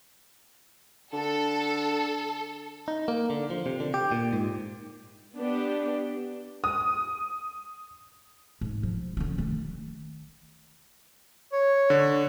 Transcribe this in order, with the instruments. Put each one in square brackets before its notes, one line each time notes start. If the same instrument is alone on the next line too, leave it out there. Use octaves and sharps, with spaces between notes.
[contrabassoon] D3 [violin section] A4
[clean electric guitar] D#4
A#3
D3
F3
C3
D3
G4
A#2
G#2
[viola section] B3 D4 G4
[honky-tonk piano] D#6
[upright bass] G#2
F3
D3 C#4
D#3 A3
[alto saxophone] C#5
[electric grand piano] D3